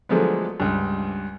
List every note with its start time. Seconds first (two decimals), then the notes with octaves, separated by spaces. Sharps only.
0.09 D3 F3 F#3 G#3 A3 B3
0.60 C#2 G2